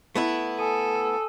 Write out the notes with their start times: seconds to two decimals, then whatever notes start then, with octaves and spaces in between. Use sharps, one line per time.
0.15 A3 B3 E4
0.59 A4 G#5 D#6 D#7
0.95 E6